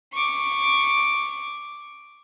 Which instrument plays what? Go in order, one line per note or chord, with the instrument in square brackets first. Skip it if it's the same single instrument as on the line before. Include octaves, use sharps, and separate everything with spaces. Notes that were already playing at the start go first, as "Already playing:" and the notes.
[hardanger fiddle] C#6 D6